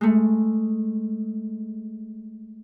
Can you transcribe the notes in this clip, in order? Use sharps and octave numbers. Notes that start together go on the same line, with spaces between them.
G#3 A3